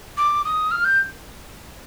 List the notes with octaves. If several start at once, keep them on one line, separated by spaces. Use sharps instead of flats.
D6
D#6
F6
G6